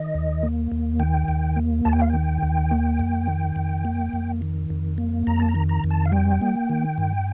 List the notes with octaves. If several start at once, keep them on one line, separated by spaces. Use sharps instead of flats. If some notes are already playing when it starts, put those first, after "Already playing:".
Already playing: D#3 D#5
D#2
A#3
D#2
D#3 G5
D#2
A#3
D#2 A5
G5
F5
D#3 G5
D#2
A#3
F2
D#3
F2
A#3
F2
D#3
F2
A#3
F2 A#5
A5
A#5
D#3
A#5
F2
A5
F5
G3 G5
A#3
D#3
G2